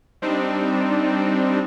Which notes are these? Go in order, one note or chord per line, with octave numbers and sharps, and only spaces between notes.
G3 C4 D4 D#4